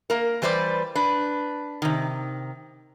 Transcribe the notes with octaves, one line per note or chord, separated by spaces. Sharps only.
A#3 A#4
E3 G3 B4 C5 D5
D4 B4
C3 D#3